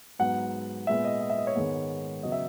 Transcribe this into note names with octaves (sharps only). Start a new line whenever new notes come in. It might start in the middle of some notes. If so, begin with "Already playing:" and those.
G#2 F#3 B3 F#5
A#2 G#3 B3 E5
D#5
D#5
E5
D#5
C#5
G#2 D#3 G#3 B3
C#3 F#3 B3 D#5
E5